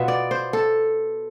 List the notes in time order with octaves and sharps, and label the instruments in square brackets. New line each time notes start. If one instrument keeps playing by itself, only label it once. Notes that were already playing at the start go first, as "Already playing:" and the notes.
Already playing: [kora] B2 B3 F4 E5
D5
C5
A4